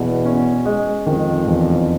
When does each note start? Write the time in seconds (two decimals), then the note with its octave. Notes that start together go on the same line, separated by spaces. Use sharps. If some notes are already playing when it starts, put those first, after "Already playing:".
Already playing: E2 B2
0.25 C#4
0.66 G#3
1.06 F2 D#3
1.47 E2